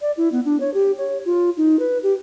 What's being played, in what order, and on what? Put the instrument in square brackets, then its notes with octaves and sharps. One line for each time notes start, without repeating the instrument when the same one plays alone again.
[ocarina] D5
E4
B3
D4
C#5
G4
C#5
F4
D#4
B4
G4